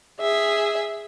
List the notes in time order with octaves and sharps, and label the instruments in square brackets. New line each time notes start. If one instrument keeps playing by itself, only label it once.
[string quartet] G#4 E5